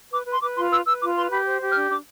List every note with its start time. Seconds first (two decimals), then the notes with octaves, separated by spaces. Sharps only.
0.11 B4 D6
0.26 B4
0.31 C6
0.41 B4 D6
0.56 F4 C6
0.70 B4 E6
0.86 B4 E6
1.01 F4 D6
1.16 B4 C6
1.31 G4 B5
1.46 C5
1.60 G4
1.70 F6
1.76 D4
1.90 D4 D6